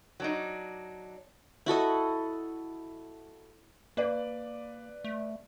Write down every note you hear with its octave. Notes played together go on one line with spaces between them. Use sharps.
F#3 D4 D#4
E4 F#4 A4 D#5
A#3 B4 D5
A3